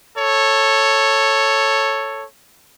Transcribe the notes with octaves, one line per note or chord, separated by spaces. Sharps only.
A4 C#5